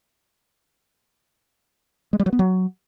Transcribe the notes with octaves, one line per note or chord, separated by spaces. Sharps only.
G#3
G3
F#3
B3
F#3